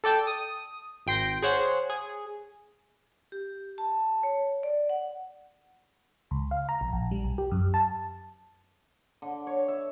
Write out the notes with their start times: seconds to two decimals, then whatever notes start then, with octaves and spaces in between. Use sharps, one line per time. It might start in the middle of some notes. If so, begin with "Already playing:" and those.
0.04 A4 D5 G5 A5
0.27 D#6
1.07 G#1 G5 C6 A#6
1.42 G#4 C5 C#5 F#5
1.90 G#4
3.32 G4
3.78 A5
4.23 C#5
4.63 D5
4.89 F#5
6.31 C#2
6.51 F5
6.69 A#5
6.81 A#1
6.93 A#1
7.11 G3
7.24 B1
7.38 G4
7.51 F#2
7.74 A5
9.22 D3
9.47 C#5
9.68 E5